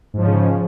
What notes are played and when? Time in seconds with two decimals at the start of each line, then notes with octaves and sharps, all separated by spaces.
0.14 G#2
0.18 F3
0.22 C#4
0.26 C#3